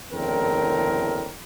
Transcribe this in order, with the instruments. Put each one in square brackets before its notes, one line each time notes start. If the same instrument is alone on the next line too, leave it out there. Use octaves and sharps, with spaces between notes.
[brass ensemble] F#1 E2 A2 D3 C4 A#4